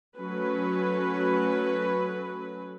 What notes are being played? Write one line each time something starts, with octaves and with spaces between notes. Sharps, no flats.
F#3 A3 C#4 B4